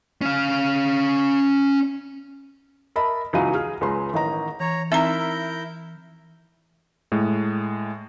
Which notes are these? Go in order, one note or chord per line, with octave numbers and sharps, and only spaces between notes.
C#4 F5
A#4 D#5 E5 A5 B5
C#2 E3 D#4 F#4 F5 D#7
G#4 F6
C#2 G#3 B4 A#5 C6
A1 D#3 D#5 A#5
E3 C#5 A#5
C4 D#4 E4 A#4 E5 A#5 G6
A2 G#3